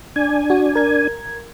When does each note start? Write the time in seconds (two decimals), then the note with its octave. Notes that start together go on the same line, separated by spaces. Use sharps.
0.16 D4 G#5
0.50 F#4
0.75 A#4 G#6